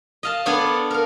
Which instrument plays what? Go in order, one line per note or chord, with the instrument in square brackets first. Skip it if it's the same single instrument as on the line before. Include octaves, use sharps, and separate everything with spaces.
[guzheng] D#5 F5 A5
B3 D4 A4 C#5 D5
A#4 F5